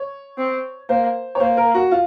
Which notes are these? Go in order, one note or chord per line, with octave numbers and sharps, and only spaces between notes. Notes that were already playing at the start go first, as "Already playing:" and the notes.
Already playing: C#5
C4
A#3 C5
C#5
A#3 C5
A#4
F#4
F4